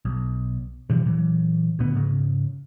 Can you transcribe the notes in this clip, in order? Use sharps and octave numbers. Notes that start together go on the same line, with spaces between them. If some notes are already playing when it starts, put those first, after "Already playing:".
B1
G2 B2 E3 F3
A#2 E3 F#3
D2 A#2 D3 B3
G#2 C#3